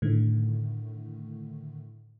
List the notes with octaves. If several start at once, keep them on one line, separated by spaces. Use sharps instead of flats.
A2 D3 D#3 A3